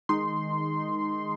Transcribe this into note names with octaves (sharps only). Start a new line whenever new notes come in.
D#3 G#3 D#4 C6